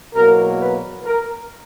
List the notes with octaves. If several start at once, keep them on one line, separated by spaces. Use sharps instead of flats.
E2 B2 F#3 A#3 A#4
B4
A#4